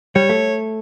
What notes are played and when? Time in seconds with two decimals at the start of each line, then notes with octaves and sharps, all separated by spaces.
0.15 G3 C#5
0.29 A3